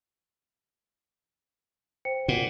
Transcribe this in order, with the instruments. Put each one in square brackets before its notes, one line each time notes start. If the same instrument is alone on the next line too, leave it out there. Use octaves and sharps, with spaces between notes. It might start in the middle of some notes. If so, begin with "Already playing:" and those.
[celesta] C5 G5 C#7
[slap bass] A#2 [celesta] F#5